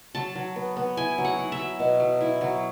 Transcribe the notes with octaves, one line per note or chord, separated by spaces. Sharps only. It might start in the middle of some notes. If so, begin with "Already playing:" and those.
F#3 A5
F#3
B3
B3
E4 G#5
F#3
F#5
E4
E5
F#3
B2
F#3
E4
F#3